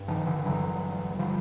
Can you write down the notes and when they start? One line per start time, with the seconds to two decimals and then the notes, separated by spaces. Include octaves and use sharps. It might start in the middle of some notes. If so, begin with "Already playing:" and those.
Already playing: G2
0.08 D#3 F3
0.26 D3 E3
0.45 G2 D3 E3 F#3
1.19 D3 F3 G3